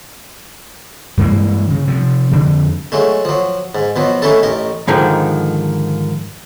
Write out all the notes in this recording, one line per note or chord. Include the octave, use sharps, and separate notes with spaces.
G2 E3 G#3 A#3
C#3
C3 F3
F2 D3
F#3 G#3 A3
F3 F#3
G#2
B2 F3 F#3
A3 C#4 D#4 E4 A4
A1 D#4 A#4
G#2 D3 D#3 F3